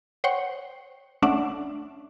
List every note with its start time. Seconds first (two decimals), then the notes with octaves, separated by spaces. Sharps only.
0.24 C5 C#5 F#5 G5 C#6
1.22 A3 C#4 D4 D5 E5 F#5